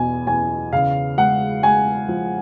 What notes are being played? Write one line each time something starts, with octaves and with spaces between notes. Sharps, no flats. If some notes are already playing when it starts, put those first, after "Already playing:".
Already playing: E2 B2 G#5
E2 G#5
C#3 F5
G#3 F#5
G#3 G#5
F3